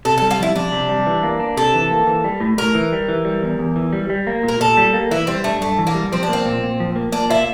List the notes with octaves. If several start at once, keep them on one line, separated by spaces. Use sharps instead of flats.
C3 A4
A4
G3
F4
F2 E4
F2 D4
C3
G3
E3
A#3
D4
C3 A4
E3
A#3
E3
G3
A2
A2 A#4
E3
G3
E3
G3
E2
E2
E3
G3
G3
A#3
A#2
A#4
A#2 A4
G3
A#3
E3 E4
G3 C4
A3 D4
G2 A3
E3
A#3
G3
F3 C4
D4
A#3 C4
A#2
A#2
F3
A#3
A#3 D4
E4 F4